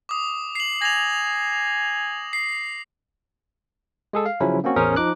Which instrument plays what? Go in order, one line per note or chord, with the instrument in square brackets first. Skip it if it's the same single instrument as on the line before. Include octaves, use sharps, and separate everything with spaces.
[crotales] D6 D#6
C7 F#7
[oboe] G#5 [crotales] A#6 F7
[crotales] C7
[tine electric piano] G#3 G#4 A4
F5
C#3 F3 F#3 C#4 E4
A#3 C4 C#4 F#4
A1 E2 C#4 A#4 C5 D#6
F3 D#4 D6 F#6